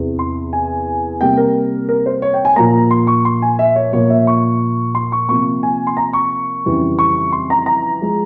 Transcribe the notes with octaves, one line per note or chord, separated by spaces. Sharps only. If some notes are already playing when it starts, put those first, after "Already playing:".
Already playing: E2 C3 E3
C6
G#5
C3 G3 A#3 G5
A#4
A#4
C5
C#5
G5
G#5
A#2 F3 A#3 A#5
C6
C#6
C6
G#5
E5
C#5
A#2 F3 A#3 C#5
E5
C#6
C6
C#6
C3 F3 A#3 C#6
G#5
C6
A#5
C#6
F2 C#3 E3 G3
C#6
C6
A#5
A#5
F3 G#3